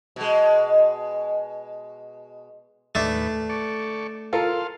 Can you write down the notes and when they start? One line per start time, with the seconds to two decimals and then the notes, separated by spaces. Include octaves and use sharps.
0.16 B2 G#3
2.95 D#2 A2 A3 D4 B4
3.49 A4 D5 C#6
4.33 F4 A4 A#4 F5 A5 C6